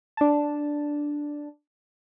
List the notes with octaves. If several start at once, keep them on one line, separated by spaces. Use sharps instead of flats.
D4 A5